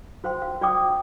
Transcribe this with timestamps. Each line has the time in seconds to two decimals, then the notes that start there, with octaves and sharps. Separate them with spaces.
0.24 F#4 C5 F5 G5 C6
0.42 F5
0.61 F#4 D5 F5 G5 D6 D#6
0.78 D5